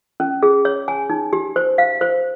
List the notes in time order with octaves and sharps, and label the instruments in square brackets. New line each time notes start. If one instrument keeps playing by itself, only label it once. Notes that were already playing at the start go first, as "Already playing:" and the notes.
[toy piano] C#4
G#4
C#5
G#5
D#4
G4
C5
F5
C5